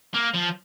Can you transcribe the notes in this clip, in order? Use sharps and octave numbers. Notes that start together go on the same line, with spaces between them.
A#3
F3